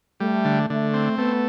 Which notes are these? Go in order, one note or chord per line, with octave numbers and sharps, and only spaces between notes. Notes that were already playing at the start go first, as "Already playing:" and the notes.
G3 A3
D3
D3 A3
C4
A3 B3